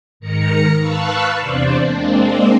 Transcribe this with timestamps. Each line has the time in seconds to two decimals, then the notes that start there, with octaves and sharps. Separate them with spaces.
0.20 G#2 D#3 A#4 A#5 C#7
0.79 B4 F5 A5 C#6 E6 F#6
1.38 E2 C3 D4 C5 D5
1.84 G#3 A#3 C4 D4